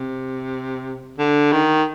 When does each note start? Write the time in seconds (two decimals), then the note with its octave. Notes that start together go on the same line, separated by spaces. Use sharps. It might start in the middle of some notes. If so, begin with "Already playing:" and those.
Already playing: C3
1.19 D3
1.52 D#3